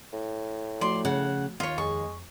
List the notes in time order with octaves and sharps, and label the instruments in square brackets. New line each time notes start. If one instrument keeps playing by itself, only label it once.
[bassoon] A2
[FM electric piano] F3 A3 F#4 [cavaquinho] D5 C6
[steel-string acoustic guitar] C#3 [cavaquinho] F#5
[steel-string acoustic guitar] D#2 [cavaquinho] F4 C#5
[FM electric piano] F2 G#4 [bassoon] G#3 [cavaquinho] C#6